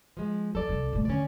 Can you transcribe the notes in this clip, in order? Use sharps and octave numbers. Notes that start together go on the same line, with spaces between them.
F3 G#3
F3 A4 D5
C2 C4
A#2 A3
D3 D#3 C#4 D5